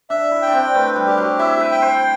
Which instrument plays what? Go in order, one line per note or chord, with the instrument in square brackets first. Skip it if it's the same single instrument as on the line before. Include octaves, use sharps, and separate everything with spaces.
[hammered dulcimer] D4 [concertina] E5
[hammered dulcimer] E4
[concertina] G5
[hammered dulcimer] D4
C4
[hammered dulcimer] A3 [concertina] B4
[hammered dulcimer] G3
[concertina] G4
[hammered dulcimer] F#3
[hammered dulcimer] E4 [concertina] E5
[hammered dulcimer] B4
[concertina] G5
[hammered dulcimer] C5